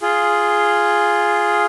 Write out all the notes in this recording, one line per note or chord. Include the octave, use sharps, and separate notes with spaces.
F4 G#4